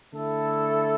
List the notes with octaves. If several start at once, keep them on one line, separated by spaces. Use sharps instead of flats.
D3 A3 E4 A4